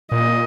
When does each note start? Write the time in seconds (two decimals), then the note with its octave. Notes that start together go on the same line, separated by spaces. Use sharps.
0.12 A#2 D#5